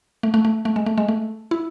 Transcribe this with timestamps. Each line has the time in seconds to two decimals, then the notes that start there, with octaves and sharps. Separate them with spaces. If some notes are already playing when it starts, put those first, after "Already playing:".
0.23 A3
0.34 A3
0.45 A3
0.65 A3
0.76 G#3
0.86 A3
0.98 G#3
1.08 A3
1.51 E4